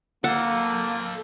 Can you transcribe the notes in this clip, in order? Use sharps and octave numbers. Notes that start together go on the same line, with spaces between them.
A#3 A4 F5 F#5